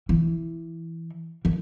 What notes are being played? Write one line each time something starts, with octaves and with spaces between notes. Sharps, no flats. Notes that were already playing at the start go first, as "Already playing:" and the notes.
E3
E3